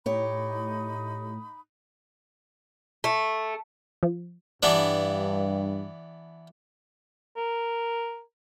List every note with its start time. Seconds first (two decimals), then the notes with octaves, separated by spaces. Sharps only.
0.06 A2 D#4 G4 C#5 B5 D#6
3.04 A3
4.03 F3
4.63 G2 E3 B3 D4
7.37 A#4